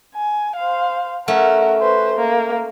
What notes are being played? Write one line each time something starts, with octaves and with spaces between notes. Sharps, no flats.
G#5
C5 F5
A3 C#4 A#4 F#5
B4 C5
A#3